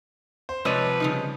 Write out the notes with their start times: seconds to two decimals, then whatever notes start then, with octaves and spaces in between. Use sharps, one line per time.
0.49 C5
0.65 C3 F3 G#3 B4 C#5 D5 D#7
1.00 C#3 G3 D#4